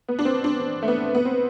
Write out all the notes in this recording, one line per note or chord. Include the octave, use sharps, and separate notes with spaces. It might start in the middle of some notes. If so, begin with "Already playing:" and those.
B3
D4
C4
D4
A3
B3
B3
C4